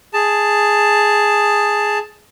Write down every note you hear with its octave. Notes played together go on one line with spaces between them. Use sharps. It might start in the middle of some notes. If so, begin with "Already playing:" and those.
G#4 A5